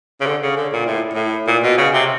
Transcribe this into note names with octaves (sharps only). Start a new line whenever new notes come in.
C#3
D3
C#3
D3
A#2
A2
A2
A#2
B2
C#3
C3